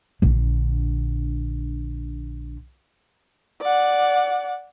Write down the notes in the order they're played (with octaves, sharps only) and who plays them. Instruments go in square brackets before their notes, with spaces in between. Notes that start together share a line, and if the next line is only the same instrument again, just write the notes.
[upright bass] A#1 D3
[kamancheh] D5 F#5